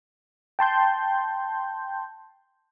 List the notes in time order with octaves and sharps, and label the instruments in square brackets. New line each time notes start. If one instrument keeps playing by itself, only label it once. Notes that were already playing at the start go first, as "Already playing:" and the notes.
[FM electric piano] G5 A5 C6 G6